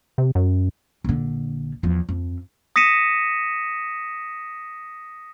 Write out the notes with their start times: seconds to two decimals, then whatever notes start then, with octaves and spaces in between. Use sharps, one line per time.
0.18 C3
0.35 F#2
1.04 A#1 D3
1.83 E2 F3
2.09 F2
2.76 D#6 A#6 B6 C#7 D#7 E7